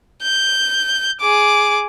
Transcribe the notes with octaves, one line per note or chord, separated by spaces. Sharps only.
G6
G#4 D6